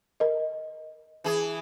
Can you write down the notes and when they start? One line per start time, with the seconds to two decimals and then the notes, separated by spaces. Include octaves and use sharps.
0.20 A#4 D#5
1.24 E3 G#4